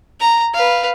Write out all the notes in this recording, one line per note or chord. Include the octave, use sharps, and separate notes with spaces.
A#5
B4 F5